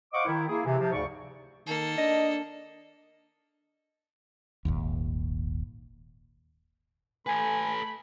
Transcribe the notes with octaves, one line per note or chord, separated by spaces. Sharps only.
C5 D#5 F5 F#5 C#6 D6
D#3 E4
A#3 E4 G#4
C3 E3
C3 F3
D2 G#2 C#3 D5 C#6
D#3 A#3 A4
D4 D#5
D#1 G#1 D#2
A3 A4 B4 G#5 B5